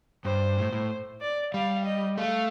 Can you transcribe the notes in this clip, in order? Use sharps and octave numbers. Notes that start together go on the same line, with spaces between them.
G2 C5
A2
A2
D5
G3 F5
D#5
A3 F5